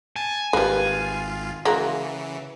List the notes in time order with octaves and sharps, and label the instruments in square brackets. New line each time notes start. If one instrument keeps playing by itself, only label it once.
[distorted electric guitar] G#5 [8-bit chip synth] A5
[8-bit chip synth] G#1 F4 [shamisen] G3 A#3 [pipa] B4
[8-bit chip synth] C#3 E3 [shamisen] G#3 A#3 F#4 [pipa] A#5